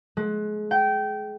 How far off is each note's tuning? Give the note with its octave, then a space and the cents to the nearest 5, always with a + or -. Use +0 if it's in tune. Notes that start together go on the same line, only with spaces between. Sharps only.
G#3 +30
G5 -20